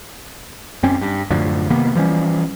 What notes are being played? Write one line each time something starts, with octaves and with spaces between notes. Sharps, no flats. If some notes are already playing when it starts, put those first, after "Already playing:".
F#2 C4 C#4
G2
F#2 A2 D3 F3
C3 D#3 A#3 B3
E3 F3 G3 C#4